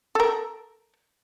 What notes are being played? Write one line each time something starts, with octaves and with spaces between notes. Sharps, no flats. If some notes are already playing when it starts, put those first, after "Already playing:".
A4 A#4